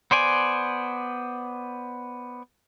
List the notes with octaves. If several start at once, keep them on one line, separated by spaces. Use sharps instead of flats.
B3 C5 D5 G#5